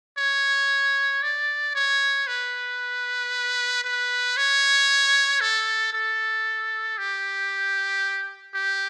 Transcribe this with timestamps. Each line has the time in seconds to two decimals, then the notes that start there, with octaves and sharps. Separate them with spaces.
0.18 C#5
1.23 D5
1.75 C#5
2.27 B4
3.84 B4
4.37 C#5
5.41 A4
5.93 A4
6.98 G4
8.54 G4